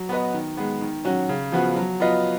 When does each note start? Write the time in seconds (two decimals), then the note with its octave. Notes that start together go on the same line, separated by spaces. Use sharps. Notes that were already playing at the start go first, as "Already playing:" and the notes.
Already playing: F#3
0.09 B3 F#4 B4 D#5
0.34 D#3
0.57 G#3 B3
0.81 D#3
1.05 F#3 C#4 F#4
1.29 C#3
1.52 F3 B3 F#4
1.76 F#3
2.00 B3 F4 B4 D#5